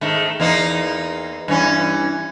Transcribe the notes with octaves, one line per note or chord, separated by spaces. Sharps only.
G#2 D#3 A3
E2 A#3 D#4
G2 E3 C#4